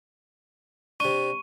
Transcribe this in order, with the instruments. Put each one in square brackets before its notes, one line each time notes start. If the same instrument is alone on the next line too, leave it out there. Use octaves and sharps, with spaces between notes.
[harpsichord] C3 D4 [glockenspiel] C#6 D#7